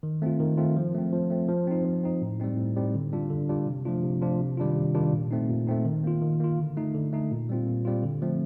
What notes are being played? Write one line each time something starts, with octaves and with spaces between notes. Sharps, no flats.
D#3
A3 C4 F4
D#3
A3 C4 F4
F3
A3 C4
F3
A3 C4
F3
C4 D#4
F3
C4 D#4
A2
G3 C4 D#4
A2
G3 C4 D#4
D3
G3 D4 F4
D3
G3 D4 F4
C3
F3 A3 D4 F4
C3
F3 A3 D4 F4
C3
D#3 G3 D4 F4
C3
D#3 G3 D4 F4
A#2
A3 C4 D#4
A#2
A3 C4 D#4
D#3
A#3 F4
D#3
A#3 F4
D3
A3 D#4
D3
A3 D#4
A#2
G3 C4 F4
A#2
G3 C4 F4
D3
F3 A3 C4